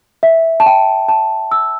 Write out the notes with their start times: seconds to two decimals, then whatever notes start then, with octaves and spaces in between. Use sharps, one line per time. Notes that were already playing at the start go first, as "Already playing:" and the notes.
0.23 E5
0.60 A5
0.66 G5
1.08 A5
1.52 E6